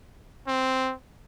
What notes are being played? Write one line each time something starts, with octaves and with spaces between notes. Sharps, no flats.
C4